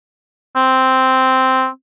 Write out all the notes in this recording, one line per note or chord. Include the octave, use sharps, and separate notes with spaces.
C4